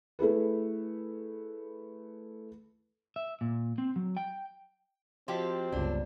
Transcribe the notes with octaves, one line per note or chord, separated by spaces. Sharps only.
A3 E4 G#4 B4
E5
A#2
C4
F#3
G5
F3 C4 F#4 G4 D#5 C6
G1 C#2 D4 F4 D5